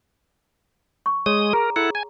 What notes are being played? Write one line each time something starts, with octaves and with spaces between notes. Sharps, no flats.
C#6
G#3 C#5 D#6
G#4 A#4 A#5
E4 A4 F#5
G#5